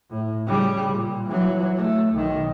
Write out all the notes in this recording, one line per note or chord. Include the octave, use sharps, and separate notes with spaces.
A2
C#3 G3
A#2
E3 F#3
A3
B1 D#3